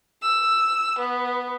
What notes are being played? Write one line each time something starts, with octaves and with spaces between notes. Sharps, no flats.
E6
B3